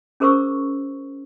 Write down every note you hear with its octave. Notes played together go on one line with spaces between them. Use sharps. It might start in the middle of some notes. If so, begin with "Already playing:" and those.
C#4 G#4 A#4 C5 C#6 E6